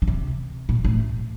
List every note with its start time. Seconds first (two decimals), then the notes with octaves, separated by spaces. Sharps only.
0.02 D3
0.07 C3
0.69 A#2
0.85 A2